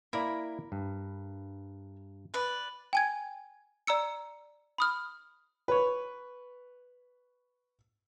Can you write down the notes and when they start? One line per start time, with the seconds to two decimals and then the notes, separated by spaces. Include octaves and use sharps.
0.13 A#3 E4 A#4 D5 B5
0.72 G2
2.34 B4 D5
2.93 G5 G#5 G#6
3.87 D5 A#5 E6 C#7
4.78 B5 D#6 F6
5.68 B4 C#5